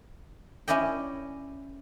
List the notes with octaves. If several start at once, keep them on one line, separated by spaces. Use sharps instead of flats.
C#4 E4 D5 D#5 G5